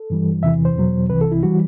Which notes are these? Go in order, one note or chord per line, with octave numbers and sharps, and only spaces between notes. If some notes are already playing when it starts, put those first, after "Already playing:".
Already playing: A4
G2 E3 G3
E2 C3 E3 E5
C5
E2 B2 F#3
C2 C3 E3 B4
A4
E4
E3 G3 F#4